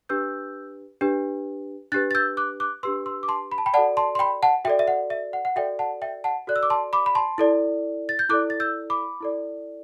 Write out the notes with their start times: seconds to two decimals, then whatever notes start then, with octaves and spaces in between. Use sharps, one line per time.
0.09 D4 G4 B4 E6 G6
1.01 D4 G4 B4
1.92 D4 G4 B4 F#6 A6
2.11 A6
2.15 E6 G6
2.37 D6 F#6
2.60 D6 F#6
2.83 D4 G4 B4 C6 E6
3.06 C6 E6
3.23 D6
3.28 A5 C6
3.52 B5
3.58 A5
3.66 G5 B5
3.74 D5 F#5 A5
3.77 F#4 A4
3.97 A5 C6
4.15 C6
4.19 G5 B5
4.43 F#5 A5
4.65 F#4 A4 D5 E5 G5
4.79 E5
4.88 F#5
5.10 E5
5.33 F#5
5.45 F#5
5.56 F#4 A4 D5 E5 G5
5.79 F#5 A5
6.02 E5 G5
6.24 F#5 A5
6.47 F#4 A4 D5 F#6
6.56 E6
6.63 D6
6.70 A5 C6
6.93 B5 D6
7.06 B5
7.15 A5 C6
7.38 E4 A4 D5
8.09 A6
8.19 G6
8.29 E4 A4 D5 D6 F#6
8.50 A6
8.60 E6 G6
8.90 B5 D6
9.21 E4 A4 D5